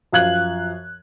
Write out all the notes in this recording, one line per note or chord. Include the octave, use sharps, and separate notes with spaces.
F#2 F3 F5 F#6 G#6 F#7